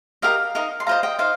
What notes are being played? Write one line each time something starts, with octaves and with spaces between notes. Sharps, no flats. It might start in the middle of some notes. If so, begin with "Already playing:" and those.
G4 A#4 D#5 F5
D#4 A#4 D#5
C6
F4 C5 D#5 F5 A#5
D#5 G5
D#4 C5 D#5 F5